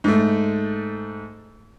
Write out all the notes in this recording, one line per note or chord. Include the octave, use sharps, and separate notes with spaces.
G#2 A3